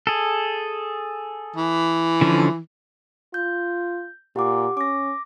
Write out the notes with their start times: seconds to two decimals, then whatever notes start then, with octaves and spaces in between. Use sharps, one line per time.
0.07 G#4 A4
1.56 E3
2.21 D3 F3 C#4
3.34 F4 G6
4.36 A#2 G4 F#5 D6
4.77 C#4 D6 A#6